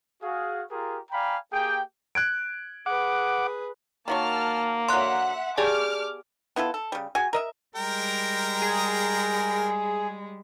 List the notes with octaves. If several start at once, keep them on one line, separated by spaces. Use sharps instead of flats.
F#4 G#4 F5
F4 G4 G#4 A#4
D5 F5 G5 G#5 A#5 B5
A#3 G4 G#4 G5
F#6 G#6 D7
G#4 B4 F#5 D6
D#3 F#3 A#3 A5 C#6 F6
D3 F#3 E5 F#5 C6 F#6
B3 G4 G#4 D5 G#5 A5 D6 F6
B3 E4 F4 A4
A4
C#3 G3
F#4 G#4 G#5
A#4 D#5 E5
G3 G#3 A#4 G5 A#5
G#4